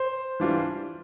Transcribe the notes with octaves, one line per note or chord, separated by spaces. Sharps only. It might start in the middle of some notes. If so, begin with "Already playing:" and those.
Already playing: C5
E3 G3 D4 F4